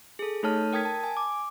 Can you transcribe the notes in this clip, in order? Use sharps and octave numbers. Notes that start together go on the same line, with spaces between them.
G#4 A4
A3 D#4 A4 C#5 A5 F6
A#4 G5 D#6 G#6 B6
A5
G#5
D6